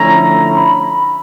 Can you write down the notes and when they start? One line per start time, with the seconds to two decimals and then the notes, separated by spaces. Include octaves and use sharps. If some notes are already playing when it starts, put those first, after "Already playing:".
Already playing: D3 F3 A3 C#4 E4 A#5
0.54 B5